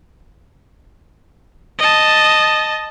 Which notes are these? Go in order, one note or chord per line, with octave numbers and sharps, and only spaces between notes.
D#5 A5